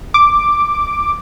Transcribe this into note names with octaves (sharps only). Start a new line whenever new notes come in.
D6